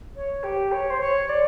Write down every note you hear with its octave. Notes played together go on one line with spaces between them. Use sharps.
C#5
G4
C#5
C5
C#5
D5